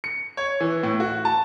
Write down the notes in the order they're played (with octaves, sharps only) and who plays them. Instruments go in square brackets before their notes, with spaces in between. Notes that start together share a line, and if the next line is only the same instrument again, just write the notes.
[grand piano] C#7
C#5
E3
A2
F#4
A5